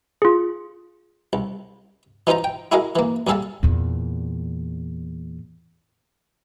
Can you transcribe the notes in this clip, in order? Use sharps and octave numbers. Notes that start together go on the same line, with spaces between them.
F4 G#4
C2
E3 D#4 F4 C5 A#5
G5
E4 F#4 G#4 A#4 D#5 F5
E3 A#3
D#2 G3 G#4 A4 F5 A5
E2 A#2